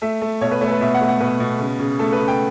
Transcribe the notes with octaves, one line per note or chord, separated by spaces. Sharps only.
A3 E5
A3
B2 C#5
B4
A3 C#5
A4
B4
B2 E5
F#5
A3
F#5
B2 B4
B2
C#3
C#3
A3 A4
B4
C#3
G5